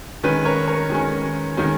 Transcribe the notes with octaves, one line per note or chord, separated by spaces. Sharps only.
D#3 G#3 C#4 B4
A#4 C#5
A#4 C#5
D#3 G#3 C#4
D#3 G#3 C#4